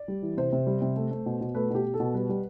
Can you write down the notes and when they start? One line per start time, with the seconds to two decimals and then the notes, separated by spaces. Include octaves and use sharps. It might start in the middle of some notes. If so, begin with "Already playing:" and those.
Already playing: D5
0.08 G3
0.23 E3
0.37 C3 C5
0.53 C3
0.67 G3
0.82 C3
0.96 A3
1.11 A3
1.26 B2
1.41 B2
1.55 A3 B4
1.70 B2 G4
1.84 B2
1.94 A4
2.00 B2
2.14 G3 B4
2.29 G3